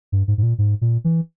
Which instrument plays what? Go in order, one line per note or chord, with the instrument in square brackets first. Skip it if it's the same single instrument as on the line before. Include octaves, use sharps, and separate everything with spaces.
[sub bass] G2
G#2
G#2
A#2
G#2
A#2
E3